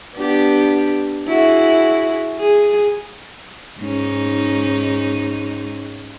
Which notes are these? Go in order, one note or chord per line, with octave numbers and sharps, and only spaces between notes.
B3 D4 G4
E4 F#4 G#4
G#4
G#2 C#4 D#4